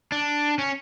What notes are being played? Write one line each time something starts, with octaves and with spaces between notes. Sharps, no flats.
D4
C#4